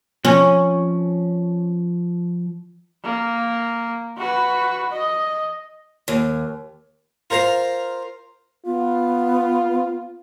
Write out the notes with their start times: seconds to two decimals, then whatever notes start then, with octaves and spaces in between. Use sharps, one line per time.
0.25 F3 C#4
3.04 A#3
4.18 F#4 B4
4.92 D#5
6.08 D#2
7.30 F4 A#4 C5 F5 A#5
8.66 B3 F4